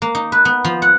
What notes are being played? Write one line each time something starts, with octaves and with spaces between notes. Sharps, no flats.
A#3
D#4
B4
B3
F3
F#5